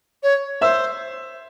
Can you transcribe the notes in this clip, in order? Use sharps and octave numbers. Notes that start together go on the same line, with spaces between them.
C#5
C5 E5 E6